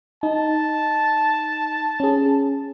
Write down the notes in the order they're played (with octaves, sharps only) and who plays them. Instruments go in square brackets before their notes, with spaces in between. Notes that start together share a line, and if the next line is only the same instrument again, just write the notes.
[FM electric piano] D#4 [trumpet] A5
[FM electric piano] C#4 G#4